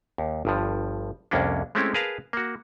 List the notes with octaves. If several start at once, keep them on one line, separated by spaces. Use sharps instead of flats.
D#2
G1 G2 F3
C2 F2 A#3 C#4 D4
G#3 A3 C4 C#4 E4 G4
G#4 A#4 B4 F5 A5 A#5
A#3 F#4